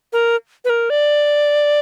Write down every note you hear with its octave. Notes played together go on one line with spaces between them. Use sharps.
A#4
B4
A#4
D5